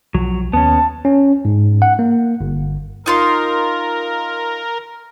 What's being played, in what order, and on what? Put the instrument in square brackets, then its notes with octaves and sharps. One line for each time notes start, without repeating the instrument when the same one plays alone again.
[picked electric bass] B1 F3 [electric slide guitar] F#3
[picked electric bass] D#2 [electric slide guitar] B3 C#4 [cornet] A5
[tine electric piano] C#4
G#2
F#5
A#3
G1
[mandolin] D#4 F4 C6 [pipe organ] A#4